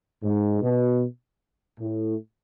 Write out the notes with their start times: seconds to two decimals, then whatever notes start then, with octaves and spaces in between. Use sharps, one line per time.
0.23 G#2
0.62 B2
1.79 A2